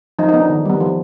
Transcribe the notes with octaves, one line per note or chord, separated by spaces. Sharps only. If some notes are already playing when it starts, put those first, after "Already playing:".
F3 D#4
D#4
B3
D4
D#3
G3 B3
F3